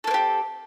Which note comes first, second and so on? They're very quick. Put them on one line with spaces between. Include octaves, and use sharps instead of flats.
A4 A#3 C4 G4